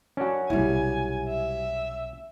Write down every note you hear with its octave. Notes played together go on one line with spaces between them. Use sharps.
C#4 D4 F#4
B1 C3 G3 E4 G#5
E5